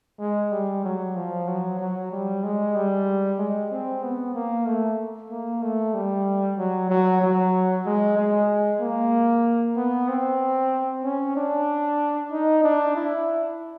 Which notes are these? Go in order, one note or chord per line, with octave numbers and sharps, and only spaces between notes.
G#3
G3
F#3
F3
F#3
F#3
G3
G#3
G3
G#3
C4
B3
A#3
A3
A#3
A3
G3
F#3
F#3
F#3
G#3
G#3
A#3
B3
C4
C#4
D4
D#4
D4
E4